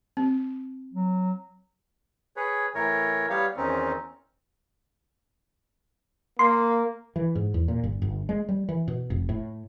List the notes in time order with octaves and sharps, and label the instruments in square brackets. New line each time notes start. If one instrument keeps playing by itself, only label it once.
[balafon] C4
[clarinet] F#3
[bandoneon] G#4 B4 C#5
A2 E3 A#4 C#5
G3 B3 G4 C#5 F5
E2 D#3 C4 C#4 D#4
[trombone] A#3 [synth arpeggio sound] C6
[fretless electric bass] E3
G#2
E2
A#2
G1
G1
G#3
G3
E3
B2
F1
A2